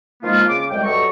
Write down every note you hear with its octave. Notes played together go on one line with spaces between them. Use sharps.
D#3 F3 G#3 A#3 B3 F4
C#3 C#4 D6
C2 A2 G3 G#3 G5
G2 F#3 A4 D#5 C#6